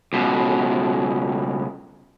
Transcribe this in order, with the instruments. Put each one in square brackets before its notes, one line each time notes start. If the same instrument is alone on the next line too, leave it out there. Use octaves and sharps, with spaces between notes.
[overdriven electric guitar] C#2 B2